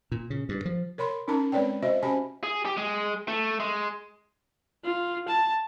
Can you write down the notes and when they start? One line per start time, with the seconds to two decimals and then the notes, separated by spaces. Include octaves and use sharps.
0.12 A#2
0.30 C#3
0.49 G2
0.65 F3
0.98 A#4 C#5 B5 C6
1.28 C#4 D#4 A#4 A5 A#5
1.52 G#3 C4 B4 C#5 D5 G5
1.83 F#4 C5 D#5 E5
2.03 C#4 G4 C5 G#5 A5 B5
2.44 G#4
2.65 G4
2.77 G#3
3.28 A3
3.60 G#3
4.84 F4
5.28 A5